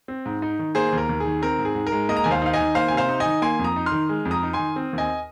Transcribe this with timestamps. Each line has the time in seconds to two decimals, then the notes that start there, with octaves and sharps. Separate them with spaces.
0.08 C4
0.25 G#2
0.42 D#4
0.59 D#3
0.75 A#3 G#4 C5
0.92 D#2
0.98 A#4
1.09 D#2
1.20 D#3 G#4
1.42 C4 A#4
1.59 G#2
1.65 G#4
1.75 G#2
1.87 A#4
1.92 G#3
2.09 A#3 A#4 D#5
2.17 A#5
2.24 D#2 G#5
2.31 C5 F5
2.42 D#4 F5
2.53 D#5 G#5
2.59 D#3
2.75 A#3 C5 F5
2.88 C3 G#5
2.97 C5 F5
3.09 D#4
3.20 D#5 G#5
3.25 D#3
3.42 A#3 G#5 C6
3.59 F2
3.64 A#5 D#6
3.76 D#4
3.86 C6 F6
3.92 D#3
4.09 G#3
4.25 F2
4.31 A#5 D#6
4.43 D#4
4.53 G#5 C6
4.59 D#3
4.76 C4
4.93 D#2
4.98 D#5 G#5